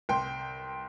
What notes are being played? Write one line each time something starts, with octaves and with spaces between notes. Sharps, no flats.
C2 G5 C6